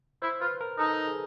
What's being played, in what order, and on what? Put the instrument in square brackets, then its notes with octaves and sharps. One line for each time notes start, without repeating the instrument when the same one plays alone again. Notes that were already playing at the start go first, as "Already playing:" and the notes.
[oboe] E4 [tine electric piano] C5
[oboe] F4 [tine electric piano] B4
[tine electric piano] A#4
[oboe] D#4 [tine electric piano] A4
[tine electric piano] G#4